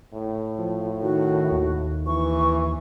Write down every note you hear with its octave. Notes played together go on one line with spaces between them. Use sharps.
A2
F3
D#3 F#4
D#2
E3 C#6